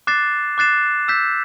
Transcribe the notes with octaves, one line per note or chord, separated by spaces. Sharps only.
D6 F#6 A6 C7 E7
D6 F#6 A6 C7 E7
E6 G6 B6 E7